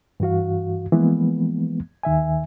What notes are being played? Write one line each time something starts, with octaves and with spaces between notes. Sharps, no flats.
G2 E3 F#4 F5
E3 F3 G#3 A#3 B3
D#2 D#3 E5 G#5